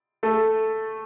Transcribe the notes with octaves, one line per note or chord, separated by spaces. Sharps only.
A3 A4